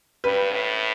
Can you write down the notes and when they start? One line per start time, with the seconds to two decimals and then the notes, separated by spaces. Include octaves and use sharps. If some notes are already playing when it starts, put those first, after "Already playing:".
0.24 G2 B4
0.52 A2